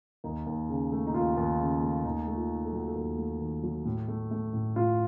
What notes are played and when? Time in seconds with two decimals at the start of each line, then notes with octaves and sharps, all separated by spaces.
0.24 D#2 D#4
0.47 D#2
0.69 C#3
0.92 A3
1.07 D#4
1.14 D#2 F4
1.37 D#2
1.59 C#3
1.82 A3
2.04 D#2 D#4
2.28 A3
2.35 F4
2.50 D#3
2.65 A4
2.73 F#3 F#4
2.88 A4
2.96 D#2
3.18 A3
3.41 D#3
3.63 F#3
3.85 A2
4.08 A3
4.31 A3
4.54 A2
4.76 A2 F4